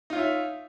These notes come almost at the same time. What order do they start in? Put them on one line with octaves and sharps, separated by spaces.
D#4 F4 C#5 E5